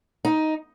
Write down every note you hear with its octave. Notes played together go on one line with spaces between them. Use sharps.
D#4